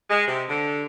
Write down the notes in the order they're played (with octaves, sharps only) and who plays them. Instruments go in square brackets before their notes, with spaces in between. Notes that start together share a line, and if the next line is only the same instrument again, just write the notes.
[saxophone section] G#3
C3
D3